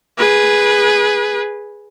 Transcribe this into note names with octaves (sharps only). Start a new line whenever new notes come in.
G#4 B4